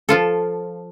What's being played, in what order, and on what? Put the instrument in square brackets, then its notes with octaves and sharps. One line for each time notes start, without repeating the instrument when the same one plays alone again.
[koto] F3 F4 A4